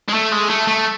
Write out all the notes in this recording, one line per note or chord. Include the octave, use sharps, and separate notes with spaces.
G#3
A3
G#3
A3
A3